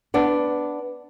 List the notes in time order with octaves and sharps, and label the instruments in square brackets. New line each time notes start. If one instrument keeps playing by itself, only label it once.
[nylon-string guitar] B3 D4